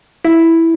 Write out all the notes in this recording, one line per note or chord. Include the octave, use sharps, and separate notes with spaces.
E4